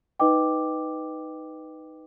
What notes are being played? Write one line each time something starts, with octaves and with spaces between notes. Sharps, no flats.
D#4 B4 D#5 G5 D6